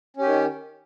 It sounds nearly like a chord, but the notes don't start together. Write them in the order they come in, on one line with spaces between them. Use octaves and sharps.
C#4 G4 D#3